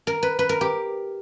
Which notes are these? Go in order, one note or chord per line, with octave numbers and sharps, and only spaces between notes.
A#4
B4
B4
A#4
G4